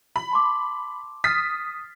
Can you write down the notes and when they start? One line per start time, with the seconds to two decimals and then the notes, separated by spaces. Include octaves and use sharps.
0.16 B5
0.31 A5 C6 D6
1.24 D#6 F6 A6 B6 C7